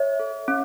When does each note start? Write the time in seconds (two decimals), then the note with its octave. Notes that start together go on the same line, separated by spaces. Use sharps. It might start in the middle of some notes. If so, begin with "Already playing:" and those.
Already playing: C#5 E5
0.20 A4
0.48 C#4